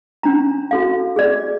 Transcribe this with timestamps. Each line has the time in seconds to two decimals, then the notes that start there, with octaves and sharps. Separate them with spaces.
0.23 C#4 D4 A#5
0.71 F#4 A4 F5
1.16 G#4 D5